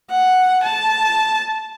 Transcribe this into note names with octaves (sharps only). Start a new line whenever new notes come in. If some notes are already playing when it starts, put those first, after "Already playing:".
F#5
A5